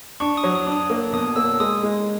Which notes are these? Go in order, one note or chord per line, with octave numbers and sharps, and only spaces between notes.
D4 C#6
D#6
F#3
D#6
D4
D#6
A#3
B2 D#6
A#3 E6
G#3 D#6
G#3